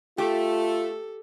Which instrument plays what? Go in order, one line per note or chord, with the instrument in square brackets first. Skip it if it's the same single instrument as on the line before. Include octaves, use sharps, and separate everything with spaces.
[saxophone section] A3 [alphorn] F4 [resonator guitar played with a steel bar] G4 [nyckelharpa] A4